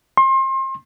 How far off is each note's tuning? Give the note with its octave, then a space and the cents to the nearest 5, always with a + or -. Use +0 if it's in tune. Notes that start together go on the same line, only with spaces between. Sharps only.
C6 +35